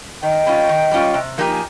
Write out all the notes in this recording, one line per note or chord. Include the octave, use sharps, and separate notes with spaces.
D#3 D#5 G5
G3 C#4 F4
D#3
G3 C#4 F4
C3
F3 A#3 D#4 G4
G#5